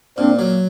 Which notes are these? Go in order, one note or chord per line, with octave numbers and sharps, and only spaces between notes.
A#2 C4 D4
F#3